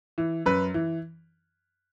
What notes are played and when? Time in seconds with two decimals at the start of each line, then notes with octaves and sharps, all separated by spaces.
0.18 E3
0.46 F#2 B4
0.74 E3